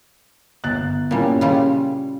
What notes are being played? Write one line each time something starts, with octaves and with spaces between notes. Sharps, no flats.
G1 F#6 A6
A#2 G3 A#3 C#4 E4
C#3 G3 F4